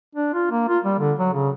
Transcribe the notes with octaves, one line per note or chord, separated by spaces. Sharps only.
D4
F4
A#3
F4
G3
D3
F#3
C#3